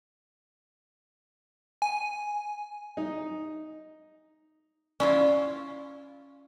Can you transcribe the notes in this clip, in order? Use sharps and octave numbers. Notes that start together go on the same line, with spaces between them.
G#5
D#4
C#4 E4 F4 D5